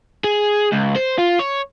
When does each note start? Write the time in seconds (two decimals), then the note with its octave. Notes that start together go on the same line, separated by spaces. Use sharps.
0.24 G#4
0.72 C#2
0.96 C5
1.18 F4
1.39 C#5